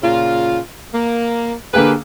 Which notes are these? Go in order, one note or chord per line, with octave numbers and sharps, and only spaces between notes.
A#2 C#3 F4
A#3
D3 A#3 G4 G#4 B4